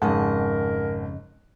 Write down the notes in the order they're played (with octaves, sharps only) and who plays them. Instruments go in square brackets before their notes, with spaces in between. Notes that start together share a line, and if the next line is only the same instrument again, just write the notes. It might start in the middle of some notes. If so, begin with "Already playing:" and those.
[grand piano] G#1 [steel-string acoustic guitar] F2 C#3 D#5 [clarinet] A#4 [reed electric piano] F#5 G#5 A5